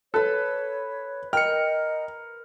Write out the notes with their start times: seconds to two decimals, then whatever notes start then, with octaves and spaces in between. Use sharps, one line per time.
0.14 A4 B4 C#5 B5
1.33 A#4 D#5 G5 F6 C#7